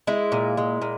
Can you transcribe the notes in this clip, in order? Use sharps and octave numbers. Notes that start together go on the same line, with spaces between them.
G#3 E4
A#2
G#3
A#2